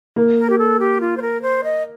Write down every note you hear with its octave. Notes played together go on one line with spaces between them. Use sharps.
A#3
A#4
G4
A4
G4
F4
C5
A#4
C5
D#5